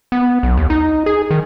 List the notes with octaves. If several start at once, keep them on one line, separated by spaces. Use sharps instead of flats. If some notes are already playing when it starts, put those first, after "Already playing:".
B3
B1
D#2
D#4
G#4
D#3